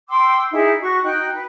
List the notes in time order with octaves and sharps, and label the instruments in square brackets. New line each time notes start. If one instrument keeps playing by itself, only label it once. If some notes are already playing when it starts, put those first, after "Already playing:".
[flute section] G5 C6 D6 E6
D#4 E4 G#4
F#4 C#6
D#4 F#4 G5 F#6
B4